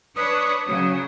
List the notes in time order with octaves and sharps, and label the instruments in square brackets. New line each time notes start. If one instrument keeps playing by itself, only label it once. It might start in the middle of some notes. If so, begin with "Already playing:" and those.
[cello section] D4 B4 C#5 [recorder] D#6
[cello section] C#3 F#3